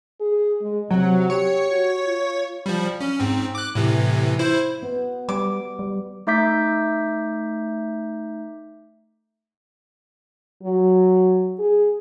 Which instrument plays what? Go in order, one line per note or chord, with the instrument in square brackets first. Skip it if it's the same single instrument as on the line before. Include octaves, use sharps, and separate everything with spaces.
[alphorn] G#4
G#3
[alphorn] C3 [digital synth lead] F#3
[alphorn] G4 [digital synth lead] C#5
[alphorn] F#4
F4
[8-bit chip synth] F3 G3
C#4
G#2 C4
D6 F#6
A2 C3 E3
E4 C5
[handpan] B3
[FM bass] G3 [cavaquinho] D6
[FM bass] G3
[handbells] A3 D#4 E5 D6 G6 B6
[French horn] F#3
G#4